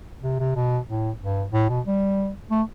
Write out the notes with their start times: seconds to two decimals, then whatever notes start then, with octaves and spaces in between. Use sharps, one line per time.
0.23 C3
0.39 C3
0.56 B2
0.88 A2
1.21 G2
1.53 A2
1.69 B2
1.85 G3
2.51 A3